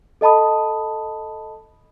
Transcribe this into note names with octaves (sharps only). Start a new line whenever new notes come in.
A4 D#5 A5 B5 D#6